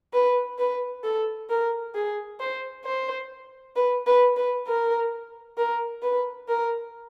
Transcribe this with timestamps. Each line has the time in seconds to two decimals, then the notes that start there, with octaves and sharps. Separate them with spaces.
0.13 B4
0.58 B4
1.03 A4
1.50 A#4
1.95 G#4
2.40 C5
2.85 C5
3.76 B4
4.07 B4
4.36 B4
4.67 A#4
5.58 A#4
6.02 B4
6.48 A#4